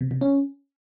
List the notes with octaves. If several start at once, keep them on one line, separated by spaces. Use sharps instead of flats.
C3
C3
C#4